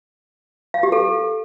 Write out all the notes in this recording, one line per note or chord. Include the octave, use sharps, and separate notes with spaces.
F5
G4
A4